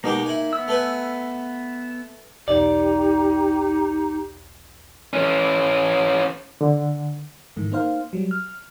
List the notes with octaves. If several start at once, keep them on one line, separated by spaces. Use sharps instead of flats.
B2 G#3 A#3 D#4 G4
E4 G#5
B3 E6
A3 B4 G#5
B1 E2 D#4 G4 D5
E3 C#4
D3
G#2 D#3 E3 A3
A#3 D#4 C5 F5
F#3 G3
F6